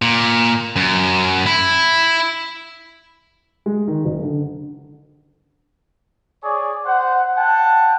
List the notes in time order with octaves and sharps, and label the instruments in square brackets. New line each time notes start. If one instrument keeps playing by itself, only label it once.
[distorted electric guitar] A#2
F#2
E4
[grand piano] G#3
D#3
F#1
D3
[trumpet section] G#4 C#5 D5
C5 F#5
F#5 G5 A5